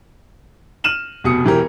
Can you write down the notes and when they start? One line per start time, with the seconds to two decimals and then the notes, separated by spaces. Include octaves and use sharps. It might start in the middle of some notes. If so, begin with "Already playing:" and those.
0.84 F6 D#7 E7 F#7
1.24 F1 B2 D#6 C#7
1.44 E1 E3 G4 A#4